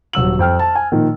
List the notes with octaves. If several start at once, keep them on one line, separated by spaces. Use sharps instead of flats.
D#1 F#3 E6 F#7
F2 G5 F6
A5
G#5
A#2 D#3 F3